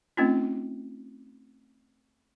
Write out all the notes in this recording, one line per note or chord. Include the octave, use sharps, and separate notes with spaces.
A3 C4 C#4 D#4 F4